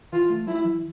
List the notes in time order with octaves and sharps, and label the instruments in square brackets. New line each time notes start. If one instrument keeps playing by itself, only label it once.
[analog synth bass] E3 [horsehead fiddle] F4
[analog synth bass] A3
[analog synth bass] F#3 [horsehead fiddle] E4
[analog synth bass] E3